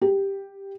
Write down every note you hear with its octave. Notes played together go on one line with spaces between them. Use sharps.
G4